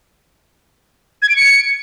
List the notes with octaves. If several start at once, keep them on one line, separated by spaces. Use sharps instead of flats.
G#6
D7
C#7